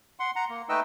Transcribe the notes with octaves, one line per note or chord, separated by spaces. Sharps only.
F#5 C6
F#5 A#5
A#3
A3 D#4 B4 D#5 G5 E6